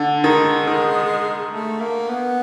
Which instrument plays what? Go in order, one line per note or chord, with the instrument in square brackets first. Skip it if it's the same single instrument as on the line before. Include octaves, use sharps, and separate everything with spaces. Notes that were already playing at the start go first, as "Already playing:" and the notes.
Already playing: [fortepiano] D3
[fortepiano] D#3 [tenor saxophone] G#3
[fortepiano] D#3
[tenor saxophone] A3
A#3
B3